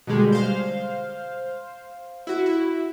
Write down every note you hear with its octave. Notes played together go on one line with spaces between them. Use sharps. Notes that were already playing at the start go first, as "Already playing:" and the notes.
B2 D3 G3 G#3
C5 F5
E4 F#4
E4